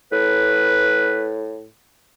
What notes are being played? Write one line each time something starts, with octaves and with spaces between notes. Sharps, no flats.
A2 B4